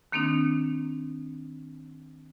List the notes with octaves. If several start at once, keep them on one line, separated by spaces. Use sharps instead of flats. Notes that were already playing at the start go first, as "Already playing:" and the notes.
D#3 A#3 C4 D4 D#4